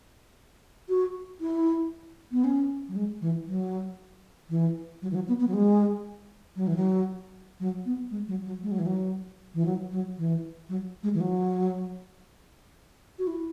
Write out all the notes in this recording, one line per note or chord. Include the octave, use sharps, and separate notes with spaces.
F#4
E4
B3
C#4
F#3
G#3
E3
F#3
E3
F#3
E3
F#3
B3
B3
F#3
G#3
F#3
E3
F#3
F#3
B3
G#3
F#3
F#3
G#3
F#3
E3
F#3
E3
F#3
F#3
E3
F#3
G#3
E3
F#3
F#4
E4